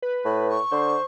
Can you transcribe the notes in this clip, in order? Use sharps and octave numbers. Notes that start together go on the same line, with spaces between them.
B4
A2
C#6
D3 C5